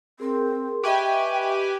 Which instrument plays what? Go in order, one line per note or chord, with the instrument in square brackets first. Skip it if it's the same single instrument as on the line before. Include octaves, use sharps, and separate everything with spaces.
[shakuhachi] C4 [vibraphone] G#4 A#4 C6
[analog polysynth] G4 B4 G#5 [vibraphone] D#5 E5 C#6 [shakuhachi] G5